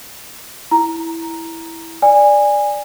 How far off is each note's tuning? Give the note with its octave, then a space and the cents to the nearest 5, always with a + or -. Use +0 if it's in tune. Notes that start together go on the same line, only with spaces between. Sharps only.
E4 +0 A#5 +0
D5 +0 G#5 -20